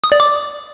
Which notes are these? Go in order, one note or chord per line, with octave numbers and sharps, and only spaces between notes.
D#6
D5
D6